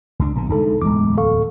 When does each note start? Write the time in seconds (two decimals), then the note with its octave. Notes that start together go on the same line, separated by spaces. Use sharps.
0.19 C#2 D4
0.35 A#1 B2 D3
0.50 C2 D3 G#3 D#4 A4
0.82 D1 E2 G#3 D6
1.18 A4 F5 C#6